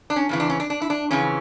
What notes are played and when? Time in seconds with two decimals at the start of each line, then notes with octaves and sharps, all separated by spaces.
0.10 D4
0.16 C#4
0.29 F2 C#3 E3
0.40 D4
0.50 C#4
0.60 D4
0.70 D4
0.82 E4
0.90 D4
1.11 F2 C#3 E3 C#4